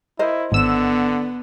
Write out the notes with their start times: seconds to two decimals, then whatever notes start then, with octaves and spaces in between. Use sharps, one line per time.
0.19 E4 A#4 C5 D#5
0.52 G#1 D3 B3 E6 E7